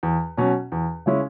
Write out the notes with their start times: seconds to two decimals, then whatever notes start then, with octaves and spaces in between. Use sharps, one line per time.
0.03 E2
0.37 B2 F#3 C#4
0.72 E2
1.06 C#3 G#3 C#4 E4